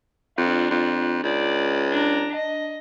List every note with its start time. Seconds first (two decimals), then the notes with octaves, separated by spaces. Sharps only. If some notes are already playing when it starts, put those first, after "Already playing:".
0.38 F2 D4 F4
0.71 F2
1.23 C#2 D5
1.91 D4 A#5
2.34 D#5